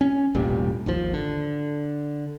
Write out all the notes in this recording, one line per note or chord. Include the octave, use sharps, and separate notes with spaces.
C#4
E1 A1 A#2 G3
G#1 D#2 F3
D3